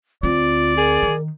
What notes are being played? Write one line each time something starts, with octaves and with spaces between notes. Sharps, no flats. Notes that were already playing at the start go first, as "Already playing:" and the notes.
D2 C4 F4 D5
G#4 A#4
D#3